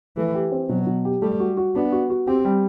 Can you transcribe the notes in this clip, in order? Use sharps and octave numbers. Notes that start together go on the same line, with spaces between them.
E3 A3
G4
C4
B2 F#3
B2
G4
G3 A3
F#4
F#4
B3 D4
F#4
F#4
C4 G4
G3